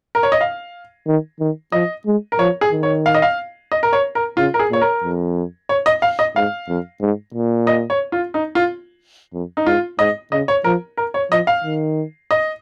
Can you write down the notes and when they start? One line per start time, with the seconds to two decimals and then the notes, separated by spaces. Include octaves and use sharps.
0.15 A#4
0.23 C#5
0.32 D#5
0.41 F5
1.07 D#3
1.40 D#3
1.72 F3 D#5
2.06 G#3
2.32 A#4
2.39 F3 C#5
2.61 G#4
2.72 D#3
2.83 C#5
3.06 F5
3.15 D#5
3.22 F5
3.72 D#5
3.83 A#4
3.93 C#5
4.15 A#4
4.37 C#3 F4
4.54 A#4
4.59 G#4
4.70 A#2 C#5
4.81 A#4
5.04 F2
5.69 C#5
5.86 D#5
6.02 F5
6.19 D#5
6.36 G#2 F5
6.69 F2
7.01 G#2
7.34 A#2
7.67 D#5
7.90 C#5
8.12 F4
8.34 D#4
8.55 F4
9.33 F2
9.57 D#4
9.66 G#2 F4
9.99 G#2 D#5
10.32 C#3 D#5
10.48 C#5
10.64 F3 A#4
10.97 A#4
11.14 C#5
11.31 F3 D#5
11.47 F5
11.64 D#3
12.31 D#5